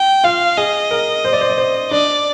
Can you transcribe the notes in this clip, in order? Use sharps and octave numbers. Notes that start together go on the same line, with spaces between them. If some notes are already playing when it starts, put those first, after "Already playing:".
Already playing: G5
F4 F5
G#4 D#5
A#4
C5
D5
C5
D5
C5
D4 D5